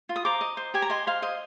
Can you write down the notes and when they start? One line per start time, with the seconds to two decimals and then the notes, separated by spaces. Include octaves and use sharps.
0.09 F4
0.16 D#6
0.25 C5 A#5 D6
0.41 D#5
0.57 C5
0.74 G4 G#5
0.82 A#5
0.90 D#5 G#5 C6
1.07 C5 F5
1.22 C5 D#5